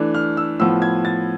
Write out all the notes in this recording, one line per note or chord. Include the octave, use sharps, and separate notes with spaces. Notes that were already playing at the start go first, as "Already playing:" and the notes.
Already playing: E3 A3 D4
F6
E6
A2 F3 B3 E6
G#6
A6